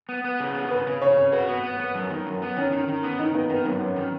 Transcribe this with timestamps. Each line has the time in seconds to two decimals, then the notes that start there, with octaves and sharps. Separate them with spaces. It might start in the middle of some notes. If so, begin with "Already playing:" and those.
0.09 B3
0.24 B3
0.40 C#3
0.55 B3
0.71 C#3 B4
0.87 C#3
1.02 C#3 C#5
1.17 C#3
1.32 F#4 B4
1.48 B3
1.63 B3
1.80 B3
1.95 F#2
2.10 D#3
2.26 F#2
2.42 B3
2.57 D#3 C#4
2.72 D#3
2.88 D#3
3.03 B3
3.19 D#3 D#4
3.34 D#3 B3
3.50 D#3 B3
3.65 F#2 B3
3.81 F#2 C#4
3.96 D#3